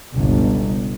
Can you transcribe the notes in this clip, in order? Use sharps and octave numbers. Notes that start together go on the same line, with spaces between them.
G1 C#2 B2